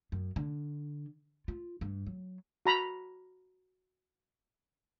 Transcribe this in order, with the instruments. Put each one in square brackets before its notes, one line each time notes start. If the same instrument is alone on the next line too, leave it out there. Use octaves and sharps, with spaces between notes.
[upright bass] F#2
D3
F4
G2
F#3
[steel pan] F#4 A#5 B5